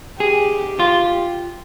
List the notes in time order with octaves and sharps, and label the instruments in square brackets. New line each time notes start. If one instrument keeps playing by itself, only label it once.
[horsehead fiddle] G4 [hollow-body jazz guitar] G#4
[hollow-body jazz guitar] F4